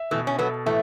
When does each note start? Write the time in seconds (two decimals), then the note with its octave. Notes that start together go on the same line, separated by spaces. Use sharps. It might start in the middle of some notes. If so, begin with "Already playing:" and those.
Already playing: E5
0.11 B2 E3 A3
0.27 C#4
0.39 F#3 B3 A4
0.66 A2 E3 A3